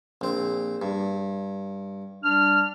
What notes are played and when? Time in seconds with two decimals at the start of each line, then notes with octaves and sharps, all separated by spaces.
0.21 A#1 C4
0.82 G2
2.23 G3 D4 F6